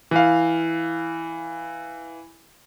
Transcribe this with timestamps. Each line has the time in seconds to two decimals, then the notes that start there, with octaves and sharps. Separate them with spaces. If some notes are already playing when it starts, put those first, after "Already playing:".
0.11 E3 F5